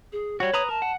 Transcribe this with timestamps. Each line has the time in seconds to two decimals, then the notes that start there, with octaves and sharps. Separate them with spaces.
0.12 G#4
0.40 G3 F#4 C#5
0.54 B4 A#5 D#6
0.69 A#4 A5
0.82 F#5